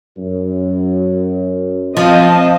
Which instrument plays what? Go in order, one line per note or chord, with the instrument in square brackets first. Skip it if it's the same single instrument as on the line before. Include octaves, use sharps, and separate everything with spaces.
[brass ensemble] F#2
[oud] F3 [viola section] C4 D#5 [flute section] F5 A5